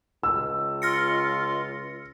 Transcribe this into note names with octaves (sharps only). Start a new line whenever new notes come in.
C#2 E6
F4 F6 A#6 C#7